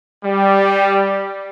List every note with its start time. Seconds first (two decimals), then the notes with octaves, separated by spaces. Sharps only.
0.24 G3